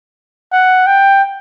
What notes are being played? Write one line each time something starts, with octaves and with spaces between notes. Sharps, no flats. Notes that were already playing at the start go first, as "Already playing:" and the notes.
F#5
G5